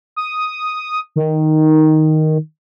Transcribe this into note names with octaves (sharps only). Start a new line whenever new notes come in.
D#6
D#3